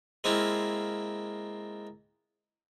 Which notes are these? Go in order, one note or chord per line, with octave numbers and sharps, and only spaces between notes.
G#3 A#3 C4 E4 F4